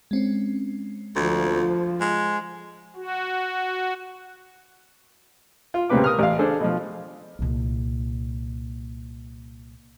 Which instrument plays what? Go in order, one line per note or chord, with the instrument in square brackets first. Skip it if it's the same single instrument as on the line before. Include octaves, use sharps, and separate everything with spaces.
[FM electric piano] G#3 C4 C#4
[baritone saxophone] D2 [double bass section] F3
[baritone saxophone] G#3
[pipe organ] F#4
[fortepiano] F4
C2 A#2 C#3 C4 B4 D6
A#4 D#6 F6
A1 F5
D4 G#4 A4 C5
B2 F3
[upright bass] C2 A#2